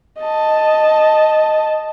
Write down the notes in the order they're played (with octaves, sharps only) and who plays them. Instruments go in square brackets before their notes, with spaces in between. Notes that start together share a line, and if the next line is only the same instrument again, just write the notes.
[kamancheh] D#5 A5